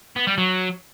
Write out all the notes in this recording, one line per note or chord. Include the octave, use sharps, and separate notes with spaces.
B3
G3
F#3